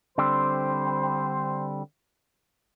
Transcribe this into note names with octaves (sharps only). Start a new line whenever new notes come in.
D3 G3 C4 C5